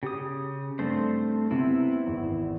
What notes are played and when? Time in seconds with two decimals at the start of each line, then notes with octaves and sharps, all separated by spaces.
0.03 C#3 G4 D#6
0.79 G2 A3 C4 C5
1.51 C3 B3 C4 E4
2.06 G#1 E2